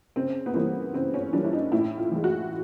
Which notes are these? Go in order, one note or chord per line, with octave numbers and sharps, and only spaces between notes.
C#3 C4
B3
E3 G3 A#3 C4
C#3 C4
C#4
E3 G3 A#3 D4
E4
D#4
A2 E4
F4
E3 G#3
F#4